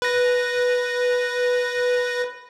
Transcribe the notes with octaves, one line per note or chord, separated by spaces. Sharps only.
B4 A#6